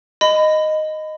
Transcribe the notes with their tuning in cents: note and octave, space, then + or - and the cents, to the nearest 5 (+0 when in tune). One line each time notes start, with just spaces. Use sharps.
D#5 -5 B5 +25